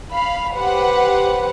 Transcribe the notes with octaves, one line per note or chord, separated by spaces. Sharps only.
F5 B5
G4 B4 C5 F#5